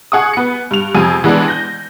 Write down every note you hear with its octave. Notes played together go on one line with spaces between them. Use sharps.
G#4 F#5 C#6 D#6
B3 C#7
G2 F7
F2 C3 G#4 D#7
E3 G#3 B3 D4
G6 A#6